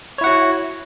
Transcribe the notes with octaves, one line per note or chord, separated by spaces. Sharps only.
E4 F#4 C#5 F#5